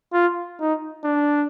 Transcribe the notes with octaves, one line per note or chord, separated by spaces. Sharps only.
F4
D#4
D4